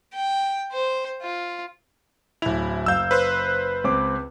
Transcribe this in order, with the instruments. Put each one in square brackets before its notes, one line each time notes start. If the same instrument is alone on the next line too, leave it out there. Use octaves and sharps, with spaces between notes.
[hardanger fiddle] G5
C5
F4
[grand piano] D1 F7 [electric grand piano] E4
[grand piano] F#1 F5 [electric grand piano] E6 G6
[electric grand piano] B4 C5 F#6
[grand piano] C#2 C4 D6